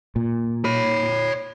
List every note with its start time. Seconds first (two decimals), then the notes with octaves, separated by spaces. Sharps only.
0.16 A#2
0.65 C#5 B5